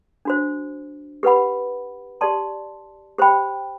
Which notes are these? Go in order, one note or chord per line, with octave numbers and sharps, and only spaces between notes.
D4 F#4 C5
G4 B4 F#5 B5
G4 D5 A5 C6
G4 C5 G5 B5